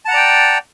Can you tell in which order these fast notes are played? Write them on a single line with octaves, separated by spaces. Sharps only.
A5 F#5 A#5 D5 G5